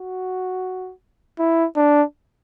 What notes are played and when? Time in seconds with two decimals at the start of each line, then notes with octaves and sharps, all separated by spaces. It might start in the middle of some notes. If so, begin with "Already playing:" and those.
Already playing: F#4
1.39 E4
1.76 D4